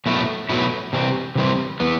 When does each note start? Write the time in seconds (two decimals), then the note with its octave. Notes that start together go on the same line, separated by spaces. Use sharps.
0.06 B2 F#3 A3 E4
0.49 B2 F#3 A3 E4
0.93 C3 E3 G3 C4
1.35 C3 E3 G3 C4
1.80 E3 B3